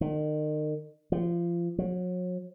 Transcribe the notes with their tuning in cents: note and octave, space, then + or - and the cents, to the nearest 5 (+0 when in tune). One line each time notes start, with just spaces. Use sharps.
D#3 -35
F3 -25
F#3 -35